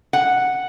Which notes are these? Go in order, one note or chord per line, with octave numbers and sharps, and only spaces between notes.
F#5